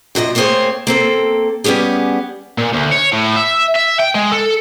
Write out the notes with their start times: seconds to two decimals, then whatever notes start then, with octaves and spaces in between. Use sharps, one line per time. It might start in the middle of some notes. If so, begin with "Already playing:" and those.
0.15 F#2 A#2 A4 D#5
0.35 A3 A#3 C4 G#4 C5 C#5
0.87 A#3 C4 A4
1.64 G3 B3 C#4 G4 G#4
2.58 A#2
2.73 D2
2.92 C#5
3.13 A2
3.37 E5
3.76 E5
4.00 G5
4.15 G#3
4.32 A4